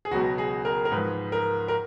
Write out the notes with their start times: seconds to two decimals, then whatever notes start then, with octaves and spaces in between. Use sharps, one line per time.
0.05 G#4
0.11 C#2 B2 F#3 F#4
0.38 G#4
0.65 A#4
0.85 A#4
0.92 G#2 F3 B4
1.32 A#4
1.68 A#4